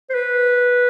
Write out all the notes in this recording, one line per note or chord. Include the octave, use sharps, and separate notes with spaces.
C5
B4